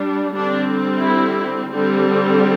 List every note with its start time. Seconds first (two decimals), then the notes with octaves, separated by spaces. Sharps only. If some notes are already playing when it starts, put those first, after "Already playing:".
Already playing: G3 D4
0.34 D3 G3 C4 D4
1.02 E4
1.70 D3 G3 C4